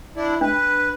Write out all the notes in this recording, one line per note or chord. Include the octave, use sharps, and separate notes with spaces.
D4 E4
D4 B4